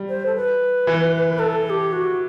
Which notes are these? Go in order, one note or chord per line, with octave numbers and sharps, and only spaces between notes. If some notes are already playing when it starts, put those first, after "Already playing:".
Already playing: G3
C5
A4
B4
E3
A4
A4
G4
F#4